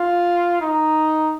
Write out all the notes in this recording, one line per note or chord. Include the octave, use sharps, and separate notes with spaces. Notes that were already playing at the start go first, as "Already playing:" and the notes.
Already playing: F4
D#4